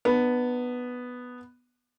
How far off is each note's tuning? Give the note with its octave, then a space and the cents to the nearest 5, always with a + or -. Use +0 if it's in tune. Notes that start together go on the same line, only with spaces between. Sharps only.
B3 +0 D4 +40